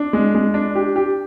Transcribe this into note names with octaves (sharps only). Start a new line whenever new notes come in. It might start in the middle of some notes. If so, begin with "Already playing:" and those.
Already playing: D4
G#3
G#3
D4
G4
G4